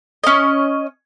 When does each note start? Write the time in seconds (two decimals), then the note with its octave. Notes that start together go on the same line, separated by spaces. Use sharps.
0.24 C#4 D#5